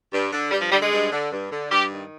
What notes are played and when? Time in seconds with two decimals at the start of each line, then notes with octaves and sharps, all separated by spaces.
0.13 G2
0.33 D3
0.51 G2 G3
0.61 F3
0.72 D3 G3
0.82 G#3
0.92 G2
1.12 D3
1.31 G2
1.51 D3
1.71 G2 G4
1.91 D#3